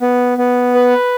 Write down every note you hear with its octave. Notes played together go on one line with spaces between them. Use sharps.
B3
B3
B4